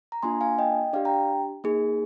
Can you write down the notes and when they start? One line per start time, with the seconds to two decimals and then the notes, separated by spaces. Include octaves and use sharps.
0.12 A#5
0.23 A#3 D4 F4 G#5 C6
0.41 F5 G#5
0.59 D#5 G5
0.93 D4 G4 D5 F5
1.05 G5 A#5
1.64 A#3 D#4 G#4